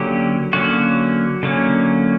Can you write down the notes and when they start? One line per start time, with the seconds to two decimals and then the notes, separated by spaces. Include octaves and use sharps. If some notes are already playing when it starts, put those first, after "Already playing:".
Already playing: D3 F#3 A#3 C#4 G4
0.53 D3 F#3 A#3 C#4 F#4
1.43 D3 F#3 A#3 C#4